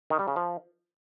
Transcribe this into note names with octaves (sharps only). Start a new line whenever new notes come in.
D#3
G3
C#3
F3